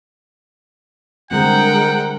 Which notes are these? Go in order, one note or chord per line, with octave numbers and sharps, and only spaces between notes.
D3 G3 G#3 C4 A#4 F#5 G5